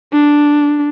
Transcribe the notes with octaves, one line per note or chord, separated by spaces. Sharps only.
D4